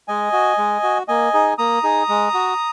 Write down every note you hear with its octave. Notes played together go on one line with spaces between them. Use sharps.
G#3 D#5 G#5
F#4
G#3
F#4
A#3 D#5 G#5
D#4 G#4
A#3 A#5 D#6
D#4 G#4
G#3
F#4